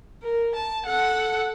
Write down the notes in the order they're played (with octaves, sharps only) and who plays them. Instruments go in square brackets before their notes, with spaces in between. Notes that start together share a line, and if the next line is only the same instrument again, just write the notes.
[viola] A#4
A5
A4 F#5